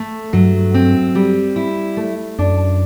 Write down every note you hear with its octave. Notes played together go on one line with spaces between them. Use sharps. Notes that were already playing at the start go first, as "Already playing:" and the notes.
Already playing: A3
G2 F#3
C4
G3
E4
A3
F#2 D4